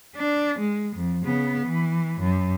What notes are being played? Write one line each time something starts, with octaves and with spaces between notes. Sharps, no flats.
D4
G#3
F2
C#3 B3
E3
F#2